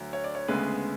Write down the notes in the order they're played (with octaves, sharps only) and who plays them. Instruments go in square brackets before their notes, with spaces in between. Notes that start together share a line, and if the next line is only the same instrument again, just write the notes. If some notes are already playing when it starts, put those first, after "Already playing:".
Already playing: [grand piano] D2 D3 F#3
C#5
D5
C#5
D2 C#3 G#3 B3 B4